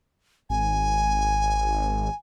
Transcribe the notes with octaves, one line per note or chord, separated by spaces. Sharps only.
G#1 G#5